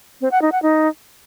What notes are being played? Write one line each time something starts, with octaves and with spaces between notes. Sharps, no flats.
C4
F#5
D#4
F#5
D#4